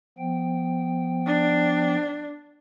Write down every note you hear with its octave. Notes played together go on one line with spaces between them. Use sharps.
F3 B3 G5
D4